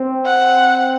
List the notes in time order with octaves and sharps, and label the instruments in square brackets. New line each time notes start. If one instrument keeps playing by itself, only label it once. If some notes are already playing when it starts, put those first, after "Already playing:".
Already playing: [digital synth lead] C4
[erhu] F#5